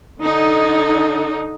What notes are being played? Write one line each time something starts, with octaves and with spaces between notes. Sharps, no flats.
D3 D#4